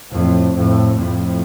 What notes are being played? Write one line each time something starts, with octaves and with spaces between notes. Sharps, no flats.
F2 A2
F2 A2
F2 A2